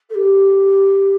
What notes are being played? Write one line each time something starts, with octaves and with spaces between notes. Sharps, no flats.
A4
G4